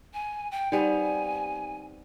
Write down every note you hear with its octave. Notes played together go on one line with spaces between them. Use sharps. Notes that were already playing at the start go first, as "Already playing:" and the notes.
G#5
G5
G3 B3 C4 D#4 G4 G#5